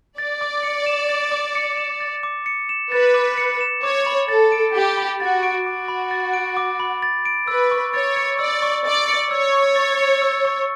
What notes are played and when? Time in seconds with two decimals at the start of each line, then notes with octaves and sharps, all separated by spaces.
0.18 D5 A6
0.41 D6
0.63 C#7
0.86 E7
1.09 A6
1.32 D6
1.55 C#7
1.77 E7
2.00 A6
2.23 D6
2.46 C#7
2.69 E7
2.91 B4 A6
3.14 D6
3.38 C#7
3.61 E7
3.83 C#5 D6
4.07 B5
4.28 A4 A6
4.52 D7
4.74 G4 D6
4.97 B5
5.20 F#4 A6
5.43 D7
5.66 F#4 D6
5.88 B5
6.11 A6
6.33 D7
6.57 D6
6.80 B5
7.02 A6
7.25 D7
7.48 B4 E6
7.71 C#6
7.94 C#5 A6
8.16 C#7
8.39 D5 E6
8.62 C#6
8.85 D5 A6
9.08 C#7
9.31 C#5 E6
9.53 C#6
9.76 A6
9.99 C#7
10.22 E6
10.45 C#6